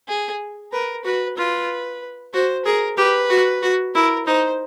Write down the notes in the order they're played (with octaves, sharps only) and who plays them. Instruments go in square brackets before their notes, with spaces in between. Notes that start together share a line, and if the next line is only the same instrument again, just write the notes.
[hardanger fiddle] G#4
[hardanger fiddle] A#4 [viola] B4
[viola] F#4 [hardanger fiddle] B4
[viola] F4 [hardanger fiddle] B4
[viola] F#4 [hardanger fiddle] C5
[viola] G#4 [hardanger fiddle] A#4
[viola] G4 [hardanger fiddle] B4
[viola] F#4
F#4
[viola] E4 [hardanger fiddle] A#4
[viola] D#4 [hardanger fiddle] C5